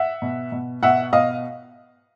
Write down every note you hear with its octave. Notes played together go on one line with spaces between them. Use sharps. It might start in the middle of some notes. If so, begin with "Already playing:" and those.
Already playing: E5 F#5
B2
B2
B2 E5 F#5
B2 D#5 F5